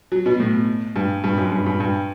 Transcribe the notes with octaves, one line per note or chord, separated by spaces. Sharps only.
F#3
B2
A2
G2
G2
F#2
G2
G2
G2